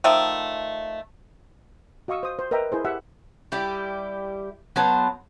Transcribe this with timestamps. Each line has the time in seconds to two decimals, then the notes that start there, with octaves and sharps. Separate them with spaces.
0.04 D#3 F3 A3
2.08 F#4 D#5 F5 C#6 D#6 E6
2.23 C5 D#6
2.39 C5
2.51 A#4 B4 D#5 E5 G5 A#5
2.72 E4 G#4 C5
2.85 G4 E5 F#5
3.52 G3 E4 G4
4.76 F#3 B3 C5 A5